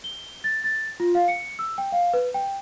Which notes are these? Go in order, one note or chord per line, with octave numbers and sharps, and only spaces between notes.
G7
A6
A6
F4
F5
C#7
E6
G5
F5
B4
G5